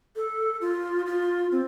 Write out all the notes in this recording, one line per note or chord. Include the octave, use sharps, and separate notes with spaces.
A4
F4
F4
C4